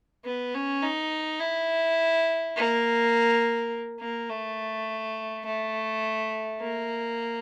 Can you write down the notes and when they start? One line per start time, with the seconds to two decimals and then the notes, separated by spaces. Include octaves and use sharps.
0.25 B3
0.54 C#4
0.83 D#4
1.41 E4
2.56 A#3
4.00 A#3
4.30 A3
5.45 A3
6.60 A#3